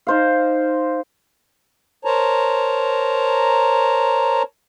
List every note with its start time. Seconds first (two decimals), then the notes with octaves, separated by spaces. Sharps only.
0.07 D#4 C5 F5
2.05 A#4 C5 C#5 A5 A#5